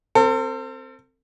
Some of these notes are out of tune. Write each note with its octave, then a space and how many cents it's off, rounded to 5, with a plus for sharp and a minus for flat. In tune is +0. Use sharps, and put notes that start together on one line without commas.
C4 +0 A4 +45